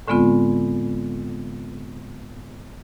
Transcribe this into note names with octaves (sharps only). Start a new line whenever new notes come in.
A2 D3 G#3 B3 C4 F4